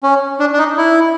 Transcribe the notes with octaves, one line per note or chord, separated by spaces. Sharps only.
C#4
D4
D4
D#4
E4